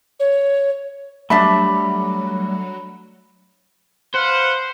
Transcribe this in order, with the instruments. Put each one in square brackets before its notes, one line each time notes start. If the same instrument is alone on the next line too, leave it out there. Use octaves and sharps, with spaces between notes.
[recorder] C#5
[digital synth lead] F#3 [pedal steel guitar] G3 A3 [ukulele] D4 E5 A5 [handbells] B5
[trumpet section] B4 F5 F#5 [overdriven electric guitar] C5